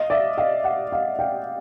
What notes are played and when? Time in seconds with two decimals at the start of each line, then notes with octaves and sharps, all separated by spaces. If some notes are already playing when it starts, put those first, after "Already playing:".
Already playing: D#5 F5
0.10 D5 E5
0.38 D#5 F5
0.64 E5 F#5
0.92 D#5 F5
1.19 F5 G5